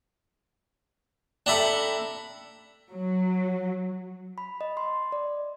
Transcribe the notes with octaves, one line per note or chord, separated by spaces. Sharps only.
D4 A4 E5 G5 A#5 B5
F#3
B5
D#5
C6
D5